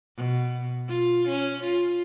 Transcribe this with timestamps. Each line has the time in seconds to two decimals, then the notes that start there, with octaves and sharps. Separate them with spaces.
0.17 B2
0.88 F4
1.28 C#4
1.63 F4